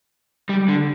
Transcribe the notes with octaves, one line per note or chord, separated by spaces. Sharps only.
G3
D3